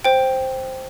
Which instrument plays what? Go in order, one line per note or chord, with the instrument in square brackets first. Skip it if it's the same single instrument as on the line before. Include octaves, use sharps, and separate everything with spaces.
[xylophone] C5 G5